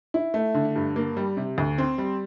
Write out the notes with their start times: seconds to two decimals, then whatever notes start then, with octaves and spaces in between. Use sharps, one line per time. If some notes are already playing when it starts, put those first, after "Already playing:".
0.14 E4
0.34 A3
0.54 D3
0.76 G2
0.96 A#3
1.17 G3
1.37 C3
1.58 D2
1.78 C4
1.98 G3